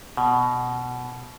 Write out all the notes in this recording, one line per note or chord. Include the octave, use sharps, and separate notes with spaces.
B2